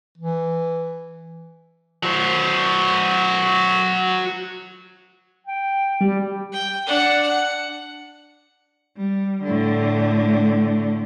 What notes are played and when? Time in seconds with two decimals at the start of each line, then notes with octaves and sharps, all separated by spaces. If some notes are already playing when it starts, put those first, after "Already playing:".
0.18 E3
2.03 F#3 C5
5.47 G5
6.01 G3
6.53 G5
6.87 D4 F#5
7.22 F#5
8.97 G3
9.43 A2 D3